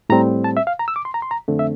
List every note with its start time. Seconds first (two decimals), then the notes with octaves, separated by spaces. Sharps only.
0.10 A2 G3 C4 A#5
0.44 A5
0.57 E5
0.67 F5
0.79 A#5
0.88 E6
0.96 D6
1.05 C6
1.14 A#5
1.22 C6
1.31 A#5
1.48 F2 D3 A3 C4
1.59 E5